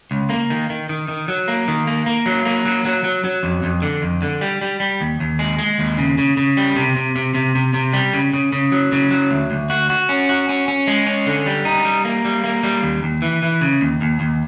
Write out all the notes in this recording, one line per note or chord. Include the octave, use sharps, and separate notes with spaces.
C#2
A#3
D#3
D#3
D#3
D#3
F#3
A#3
D#3
A#3
A#3
F#3
A#3
F#3
F#3
F#3
F#3
F2
F2
D3
F2
D3
G3
G3
G3
D#2
D#2
G#3
G#3
D#2
C#3
C#3
C#3
G3
C3
C3
C3
C3
C3
C3
G3
C#3
C#3
C#3
F#3
C#3
F#3
D2
D2
F#4
F#4
C#4
F#4
C#4
C#4
G#3
C#4
D3
G3
D#4
G3
A#3
G3
A#3
G3
D#2
D#2
E3
E3
C#3
D#2
D#2
D#2